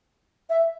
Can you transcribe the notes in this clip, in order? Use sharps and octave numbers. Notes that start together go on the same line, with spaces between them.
E5